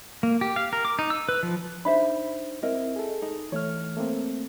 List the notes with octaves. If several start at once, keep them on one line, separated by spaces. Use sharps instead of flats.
A#3
G4
F5
A#4
D6
D#4
E6
B4
F3
D4 D#4 C5 E5 B5
C4 E4 A#4 D#5
G#4 A4
D#4
E3 A3 C#5 F6
A3 A#3 C4